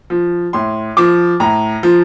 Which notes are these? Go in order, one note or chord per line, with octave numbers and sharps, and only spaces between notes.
F3
A2 C6
F3 D6
A2 A#5
F3